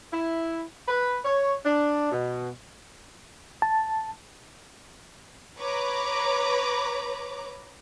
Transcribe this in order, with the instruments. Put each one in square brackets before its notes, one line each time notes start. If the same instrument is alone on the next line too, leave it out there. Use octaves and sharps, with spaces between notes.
[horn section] E4
B4
C#5
D4
B2
[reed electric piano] A5
[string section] B4 C#5 A#5 B5 D6